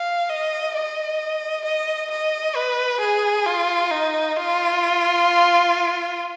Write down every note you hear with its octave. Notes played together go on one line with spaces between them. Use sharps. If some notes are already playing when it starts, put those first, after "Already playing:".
Already playing: F5
D#5
D#5
D#5
D#5
B4
G#4
F4
D#4
F4